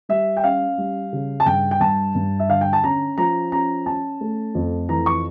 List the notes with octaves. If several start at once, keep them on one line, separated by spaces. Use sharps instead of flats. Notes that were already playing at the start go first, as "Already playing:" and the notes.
G3 E5
G5
C#4 F5
G3
C#3
A5
G2 G5
G5
G2 A5
G2
E5
D3 F5
G5
A5
C#4 A#5
F3 A#5
C#4 A#5
C#4 A5
A3
F2
E3 A#5
C#6